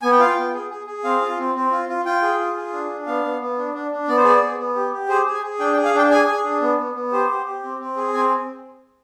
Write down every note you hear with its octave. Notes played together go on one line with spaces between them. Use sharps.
B3 G#5
G5
F4 F5
G5
B3
G#4
G#4
G#4
C4 F5
F4
C4
C4
F4
F4
F4 G5
G#4
F4
G#4
D4
D4
B3 F5
B3
B3
D4
D4
D4
B3 D5
C5
G#4 D5
B3
B3
G4
G4
G#4 C5
G#4
G#5
G#4
D4 G5
G5
G#4
F5
D4 G5
G#4 G#5
G#4
D4
B3
B3
B3
G4 C5
G4
G4
C4
C4
G#4
C4 G#5